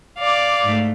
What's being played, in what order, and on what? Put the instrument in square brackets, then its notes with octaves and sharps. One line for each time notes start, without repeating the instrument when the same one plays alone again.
[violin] D5 F5 [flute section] D6
[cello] G#2 A3